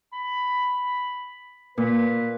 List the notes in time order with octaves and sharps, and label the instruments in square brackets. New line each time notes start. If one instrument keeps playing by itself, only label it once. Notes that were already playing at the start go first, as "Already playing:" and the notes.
[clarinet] B5
[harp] A#2 [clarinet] B4